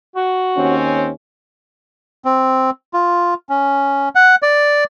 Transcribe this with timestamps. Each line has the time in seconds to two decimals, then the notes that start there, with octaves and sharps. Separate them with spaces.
0.16 F#4
0.56 D#2 C4 C#4
2.25 C4
2.93 F4
3.49 C#4
4.15 F#5
4.42 D5